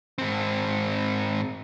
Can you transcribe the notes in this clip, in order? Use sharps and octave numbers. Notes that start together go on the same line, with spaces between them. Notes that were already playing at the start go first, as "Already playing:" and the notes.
G#2 C4